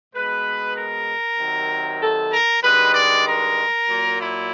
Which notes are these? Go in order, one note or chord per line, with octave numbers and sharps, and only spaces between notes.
B2 G#3 B4
A#4
C3 D#3 F#3
A4
A#4
G2 D#3 G#3 B4
D5
A#4
A#2 F#3
E4